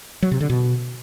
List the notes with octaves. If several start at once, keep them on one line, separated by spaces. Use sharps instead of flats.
F#3
C3
D3
B2